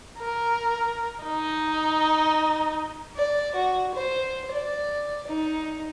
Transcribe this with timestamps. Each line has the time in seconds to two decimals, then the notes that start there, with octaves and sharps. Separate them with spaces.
0.20 A#4
1.24 D#4
3.16 D5
3.55 F#4
3.95 C5
4.51 D5
5.27 D#4